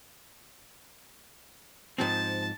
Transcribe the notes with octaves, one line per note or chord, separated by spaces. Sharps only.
G#2 F3 C4 A5